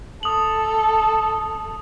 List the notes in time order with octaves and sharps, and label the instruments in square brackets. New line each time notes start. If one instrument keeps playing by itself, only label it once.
[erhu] A4 [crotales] D#6 F#7